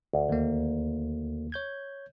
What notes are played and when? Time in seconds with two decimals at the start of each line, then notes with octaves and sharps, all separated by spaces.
0.13 D2
0.29 D#2 A#3
1.52 C#5 G6 G#6